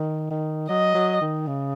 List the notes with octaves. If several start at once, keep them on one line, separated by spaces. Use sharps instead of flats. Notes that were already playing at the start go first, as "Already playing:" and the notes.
Already playing: D#3
D#3
F#3 D#5
F#3
D#3
C#3